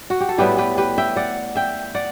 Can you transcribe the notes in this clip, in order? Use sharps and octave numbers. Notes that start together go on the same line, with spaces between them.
F#4
G4
A4
A2 G3 B3 E4 G4 B4
G4 B4
G4 B4
E5 G5
D5 F#5
E5 G5
D5 F#5